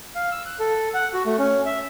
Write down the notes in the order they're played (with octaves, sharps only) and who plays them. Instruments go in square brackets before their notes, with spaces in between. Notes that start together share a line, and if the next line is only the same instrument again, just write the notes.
[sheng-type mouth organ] F5
E6
F#6
A4
F#5
F#4
A3
C#4
E5